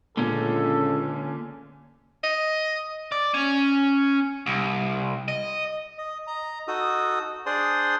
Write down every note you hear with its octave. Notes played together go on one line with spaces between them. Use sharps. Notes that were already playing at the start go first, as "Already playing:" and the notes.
C#2 A#2 D3 C#4 A4
D#5
D5
C#4
C2
D#5
D#5
D#5 A#5
D#4 F#4 A4 D#6
D4 G#4 C5 D5 C6 D#6